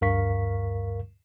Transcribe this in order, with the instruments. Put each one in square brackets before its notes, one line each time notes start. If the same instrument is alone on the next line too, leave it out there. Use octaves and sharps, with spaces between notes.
[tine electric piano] D2 G2 A#4 F5 C#6 B6